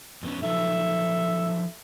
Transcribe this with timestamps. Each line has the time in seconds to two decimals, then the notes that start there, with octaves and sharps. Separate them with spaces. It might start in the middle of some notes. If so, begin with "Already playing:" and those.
0.23 F2 B3 C#4
0.43 F3 F#3 D#4 A4 E5